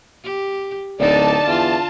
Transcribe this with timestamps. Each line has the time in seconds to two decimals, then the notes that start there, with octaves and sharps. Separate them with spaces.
0.24 G4
0.99 D1 D3 D4 D#4 D5 A5
1.47 E2 F4